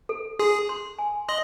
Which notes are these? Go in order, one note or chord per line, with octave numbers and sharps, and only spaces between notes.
A4
G#4 C6
C6
G#5
D#5 C6